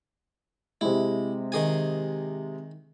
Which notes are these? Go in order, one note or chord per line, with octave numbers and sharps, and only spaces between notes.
C3 G#3 E4
D#3 G#4 G#5